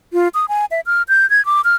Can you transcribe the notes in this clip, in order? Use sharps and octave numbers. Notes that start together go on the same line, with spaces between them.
F4
D#6
G#5
E5
F6
G6
G#6
D6
F6